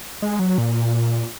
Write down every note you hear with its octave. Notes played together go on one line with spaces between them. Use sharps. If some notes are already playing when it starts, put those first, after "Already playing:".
G#3
F#3
A#2